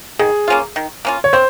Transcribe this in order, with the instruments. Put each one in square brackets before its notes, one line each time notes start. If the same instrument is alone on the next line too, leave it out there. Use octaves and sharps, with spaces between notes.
[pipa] D#3 [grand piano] G#4
[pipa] A#3 C#4 F4
D#3
A#3 C#4 F4
[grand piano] C#5
[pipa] C4 [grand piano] C5